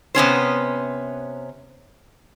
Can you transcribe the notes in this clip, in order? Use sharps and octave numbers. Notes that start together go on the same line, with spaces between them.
C3 B3 C#4 C5